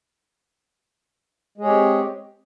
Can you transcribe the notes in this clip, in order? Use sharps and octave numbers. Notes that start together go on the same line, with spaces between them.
G#3 C4 G4 G#4 C#5